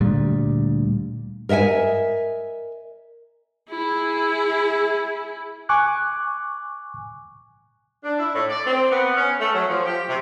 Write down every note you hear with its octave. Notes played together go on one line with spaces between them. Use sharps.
D2 A#2 G3
A#4 D#5 E5 F#5 G#5
E4 G#4
G#5 C#6 D6 F#6
D4
E4
A2
D5
C4
B3
C#4
A3
F#3
F3
G4
C3